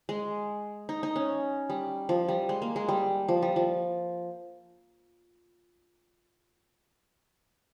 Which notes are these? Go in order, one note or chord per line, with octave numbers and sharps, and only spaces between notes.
G#3
D#4
D#4
C#4
G3
F3
G3
G#3
A#3
G#3
G3
F3
G3
F3